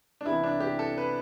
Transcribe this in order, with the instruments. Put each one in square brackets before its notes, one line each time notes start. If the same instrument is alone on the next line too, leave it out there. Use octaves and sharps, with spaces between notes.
[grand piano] D4
C2 C3 E3 B3 E4
D4
G4
A4
B4